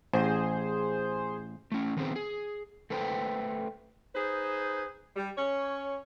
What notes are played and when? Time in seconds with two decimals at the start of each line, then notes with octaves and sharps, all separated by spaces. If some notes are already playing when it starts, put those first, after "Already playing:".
0.13 A1 G#4 C5
1.72 A3 C#4
1.97 D#3 B3 C4 G#4 C5
2.16 G#4
2.90 A3 A4 B4 C5 G5
4.15 D#4 G#4 B4 C5
5.16 G3
5.38 C#4 C#5